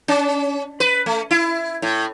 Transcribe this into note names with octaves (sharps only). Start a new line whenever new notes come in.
C#4
B4
A3
E4
A2